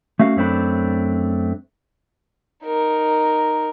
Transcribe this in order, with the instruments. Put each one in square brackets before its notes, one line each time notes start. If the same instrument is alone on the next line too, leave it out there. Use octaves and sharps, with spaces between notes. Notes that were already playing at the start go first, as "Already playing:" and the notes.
[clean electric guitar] A3 C#4 F#4 F5
F#2 A3 C4 D4 B5
[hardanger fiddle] D#4 A#4